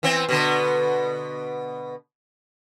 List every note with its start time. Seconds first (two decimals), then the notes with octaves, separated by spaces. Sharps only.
0.03 E3 B3 C4
0.29 B2 D3 B3